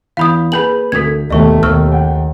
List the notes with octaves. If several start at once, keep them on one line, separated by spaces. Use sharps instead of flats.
E2 F5 B5 D#6 G6
A#3 G#4 B4 B5 G6 F#7
D2 A4 A#4 G#6 B6
D#2 B2 A3 D5 D#5 C#6
D#2 C#6 E6 F6
F#5 G5